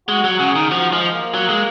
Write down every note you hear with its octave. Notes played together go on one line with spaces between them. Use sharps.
G#3 F#4
F#3
F#4
C#3
D#3 G#4
F3 F#4
F3 G#3
G#3
A#3
F#3
G#3